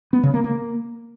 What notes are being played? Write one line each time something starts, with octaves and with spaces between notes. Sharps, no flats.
B3
C#3
A#3
A#3